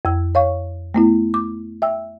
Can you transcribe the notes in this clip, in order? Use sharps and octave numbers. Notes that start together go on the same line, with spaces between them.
F2 E6
C#5 F5 C#6
A3 B3 E4
D6
E5 G5 E6